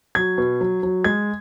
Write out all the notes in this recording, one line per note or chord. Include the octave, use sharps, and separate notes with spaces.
F#3 G#6
B2
F#3
F#3
G#3 G#6